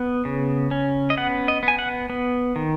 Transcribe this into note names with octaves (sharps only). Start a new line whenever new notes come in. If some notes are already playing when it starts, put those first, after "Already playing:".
Already playing: B3
C#3
C#4
D#5
B3 F#5
D#5
B3
G#5
F#5
B3
D#3